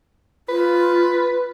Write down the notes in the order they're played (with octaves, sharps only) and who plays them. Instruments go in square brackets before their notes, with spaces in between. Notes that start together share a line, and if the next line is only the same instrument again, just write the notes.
[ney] F4 [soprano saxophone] B4